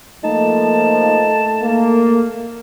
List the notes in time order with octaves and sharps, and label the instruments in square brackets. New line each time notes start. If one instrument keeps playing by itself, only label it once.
[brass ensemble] F3 A#3 [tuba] A3 [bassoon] D#4 [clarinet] A5
[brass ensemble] A#3